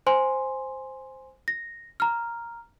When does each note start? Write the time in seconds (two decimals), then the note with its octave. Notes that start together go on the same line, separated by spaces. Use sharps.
0.07 C5 G#5 C6
1.48 A#6
2.00 A#5 F6